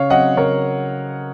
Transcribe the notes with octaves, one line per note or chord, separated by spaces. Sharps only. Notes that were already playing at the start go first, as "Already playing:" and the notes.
Already playing: C#3 C#5 F5
F#3 C4 D#5 F#5
C#3 A#4 C#5